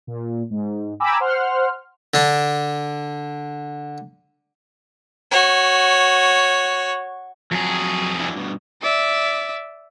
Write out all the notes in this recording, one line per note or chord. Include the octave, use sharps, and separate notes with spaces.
A#2
G#2
G5 G#5 A#5 B5 D6 E6
C5 F#5 C6 F6
D3 D4
F#4 C#5
F2 F#3 G#4
F#3 D4 E4
G2 B2
D5 E5